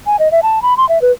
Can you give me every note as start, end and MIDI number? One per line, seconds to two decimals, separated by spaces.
0.07 0.17 80
0.19 0.31 75
0.32 0.40 76
0.43 0.62 81
0.62 0.77 83
0.77 0.88 84
0.89 1.01 76
1.02 1.12 71